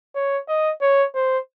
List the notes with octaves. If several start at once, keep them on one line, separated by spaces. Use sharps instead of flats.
C#5
D#5
C#5
C5